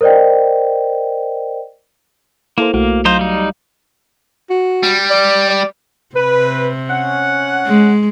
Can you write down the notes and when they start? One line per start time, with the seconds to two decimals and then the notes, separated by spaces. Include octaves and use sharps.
0.01 A#4 C5 D5 D#5 G5
2.58 A#3 E4 A4 C5
2.74 B1 A3 A#3 F#4
3.05 F#3 D#4 C5 F5
3.19 G3 D#4
4.50 F#4
4.83 G3
5.11 D5
5.50 D5
6.16 C3 B4
6.90 C#4 F#5
7.67 G#3